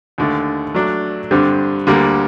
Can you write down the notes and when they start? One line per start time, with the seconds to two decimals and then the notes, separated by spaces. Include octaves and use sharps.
0.18 D#2 D3 A3
0.75 F#3 A3 D4
1.31 G2 D3 G3 C4
1.87 D2 D3 G3 A#3